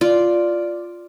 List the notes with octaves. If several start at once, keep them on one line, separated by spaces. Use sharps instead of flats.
F4 D5